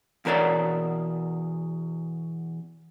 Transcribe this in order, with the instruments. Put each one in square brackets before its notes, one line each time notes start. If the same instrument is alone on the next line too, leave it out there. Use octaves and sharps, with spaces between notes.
[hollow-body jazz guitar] E2 B2 A#4 C#5 D5